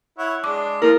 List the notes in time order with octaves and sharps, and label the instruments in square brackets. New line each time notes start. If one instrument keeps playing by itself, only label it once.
[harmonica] E4 C#5 F#5
[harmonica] G#3 D4 [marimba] D6
[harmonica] F3 F5 [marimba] A#3 E4 [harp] A#4